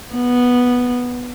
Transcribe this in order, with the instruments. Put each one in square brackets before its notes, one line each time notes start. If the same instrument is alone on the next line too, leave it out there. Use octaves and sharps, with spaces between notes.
[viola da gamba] B3